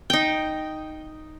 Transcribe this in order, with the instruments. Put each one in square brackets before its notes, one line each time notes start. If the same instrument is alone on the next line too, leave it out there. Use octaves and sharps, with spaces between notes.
[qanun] D#4 G5